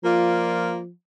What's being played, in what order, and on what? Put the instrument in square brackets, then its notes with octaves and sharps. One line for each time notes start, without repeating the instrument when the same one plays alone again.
[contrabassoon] F3 [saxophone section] A#3 F4 D5